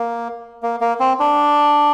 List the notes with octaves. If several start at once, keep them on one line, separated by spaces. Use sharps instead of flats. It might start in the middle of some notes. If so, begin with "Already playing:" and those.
Already playing: A#3
A#3
A#3
C4
D4